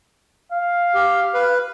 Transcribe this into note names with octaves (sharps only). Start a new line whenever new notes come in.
F5
G4
B4